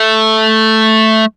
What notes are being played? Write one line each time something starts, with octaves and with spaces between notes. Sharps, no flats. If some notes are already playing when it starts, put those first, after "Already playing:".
Already playing: A3